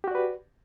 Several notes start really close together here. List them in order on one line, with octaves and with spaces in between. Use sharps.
G4 F#4 D5 B4